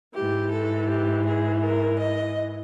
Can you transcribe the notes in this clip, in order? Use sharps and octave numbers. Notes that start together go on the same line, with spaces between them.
G#2 E3 G4
A4
G4
G#4
A#4
D#5